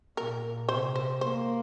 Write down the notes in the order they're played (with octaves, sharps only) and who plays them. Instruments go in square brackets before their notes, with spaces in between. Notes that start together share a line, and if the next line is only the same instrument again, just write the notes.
[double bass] A#2 [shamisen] A#4
[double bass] C3 [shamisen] C5
[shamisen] C5
[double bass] A#3 [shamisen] C5